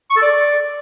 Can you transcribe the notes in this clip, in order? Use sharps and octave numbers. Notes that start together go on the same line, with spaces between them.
C#6
A4
D5